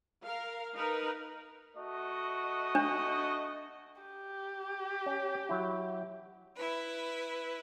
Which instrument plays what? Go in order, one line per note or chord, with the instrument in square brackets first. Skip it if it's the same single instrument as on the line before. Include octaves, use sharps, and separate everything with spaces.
[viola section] A#4 F5
D#4 A#4 B4
[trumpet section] A3 F#4 D#5
[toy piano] D4
[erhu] G4
[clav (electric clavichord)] C#4
F#3 E4
[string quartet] E4 B4